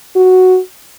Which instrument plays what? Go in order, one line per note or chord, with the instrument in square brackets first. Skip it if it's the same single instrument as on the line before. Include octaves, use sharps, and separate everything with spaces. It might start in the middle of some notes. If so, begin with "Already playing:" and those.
[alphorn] F#4